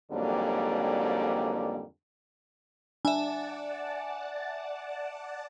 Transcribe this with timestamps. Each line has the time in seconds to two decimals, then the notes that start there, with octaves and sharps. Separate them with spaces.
0.11 F2 G#2 D3 F#3 G3 A#3
3.05 D4 D5 E5 F#5 G#5 A5